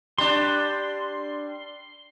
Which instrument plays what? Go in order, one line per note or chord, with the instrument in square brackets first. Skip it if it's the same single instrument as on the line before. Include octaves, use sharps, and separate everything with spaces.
[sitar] G3 D4 [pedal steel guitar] C6